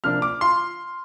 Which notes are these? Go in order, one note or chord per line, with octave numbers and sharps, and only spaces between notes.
C3 F3 A#3 D4 F6
D6
F4 C6